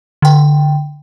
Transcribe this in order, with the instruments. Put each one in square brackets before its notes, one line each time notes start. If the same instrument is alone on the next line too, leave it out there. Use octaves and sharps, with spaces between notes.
[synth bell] D3 G5